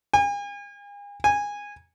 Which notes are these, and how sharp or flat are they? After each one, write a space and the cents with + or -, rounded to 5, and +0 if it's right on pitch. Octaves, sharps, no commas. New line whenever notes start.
G#5 -40
G#5 -15